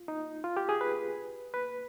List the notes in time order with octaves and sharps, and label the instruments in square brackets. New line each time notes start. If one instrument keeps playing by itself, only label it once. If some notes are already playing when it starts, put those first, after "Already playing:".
Already playing: [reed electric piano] F4
D#4
F4
G4
G#4
B4
B4